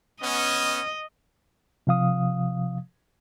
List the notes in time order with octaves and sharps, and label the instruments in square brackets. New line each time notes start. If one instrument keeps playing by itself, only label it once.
[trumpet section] B3 C#4 [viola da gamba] D#5
[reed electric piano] C3 F3 F5 D#6